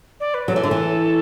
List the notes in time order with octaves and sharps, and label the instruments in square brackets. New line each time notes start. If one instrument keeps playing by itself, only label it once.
[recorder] D5
B4
[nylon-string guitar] F#3 [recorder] A4
[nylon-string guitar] E3
D3
E3